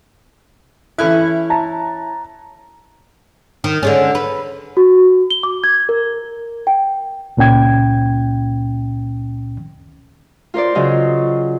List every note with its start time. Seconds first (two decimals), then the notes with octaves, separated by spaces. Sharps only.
0.98 E3 C#4 E4 A4 F#6
1.50 A5 A#5
3.64 D#3
3.83 D3 G#3 C#4
4.15 B4
4.77 F#4
5.30 G7
5.43 D6
5.64 G#6
5.89 A#4
6.67 G5
7.37 C#2 A#2 C#4 G5 G#6
10.54 F4 A#4 C5 D5
10.75 C#3 F#3 F4 D#5